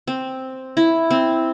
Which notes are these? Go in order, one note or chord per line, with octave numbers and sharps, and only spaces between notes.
C4
E4
C4